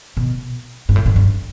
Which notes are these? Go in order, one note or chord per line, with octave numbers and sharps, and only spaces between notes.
B2
G#2
A2
G#2
G2